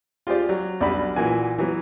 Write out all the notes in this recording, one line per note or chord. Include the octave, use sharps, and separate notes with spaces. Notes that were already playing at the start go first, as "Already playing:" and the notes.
F4 G4 G#4 C5 D5
F#3
B1 G3 D4 F#4 D5 B5
A#2 E3 F#4 G#5
E3 F#3 B3